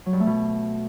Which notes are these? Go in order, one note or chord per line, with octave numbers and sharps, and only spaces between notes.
F#3
G2
A3
B2